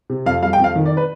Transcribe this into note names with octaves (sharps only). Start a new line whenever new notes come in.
C3
F2 F5
G3 F5
G5
F2
F5
D#3
D5
B4